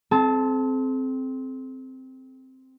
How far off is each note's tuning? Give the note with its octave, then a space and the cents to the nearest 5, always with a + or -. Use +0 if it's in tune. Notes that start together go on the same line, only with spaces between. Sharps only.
C4 +0 A4 -45 A5 +0